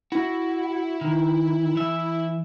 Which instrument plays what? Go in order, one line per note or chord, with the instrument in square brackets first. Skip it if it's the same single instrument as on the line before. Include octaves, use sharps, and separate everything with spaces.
[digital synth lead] E4 [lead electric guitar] F#4
[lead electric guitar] D#3
E3 E5